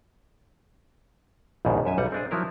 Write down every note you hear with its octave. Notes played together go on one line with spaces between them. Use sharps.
A#1 D#2 G#2 B2
F#2 E5 G#5
B1 G3 F#5
C4 D4 G#4
F3 F#3 E4 A#4